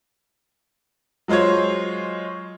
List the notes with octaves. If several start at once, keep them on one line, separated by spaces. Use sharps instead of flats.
F#3 G#3 F4 C5 C#5